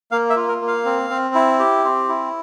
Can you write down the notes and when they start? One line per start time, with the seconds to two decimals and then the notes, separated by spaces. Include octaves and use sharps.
0.11 A#3 F5
0.30 E5
0.36 F4
0.48 A#4
0.61 A#3
0.68 F5
0.85 C4
1.10 C4
1.35 E4
1.59 G4
1.84 C4
2.09 E4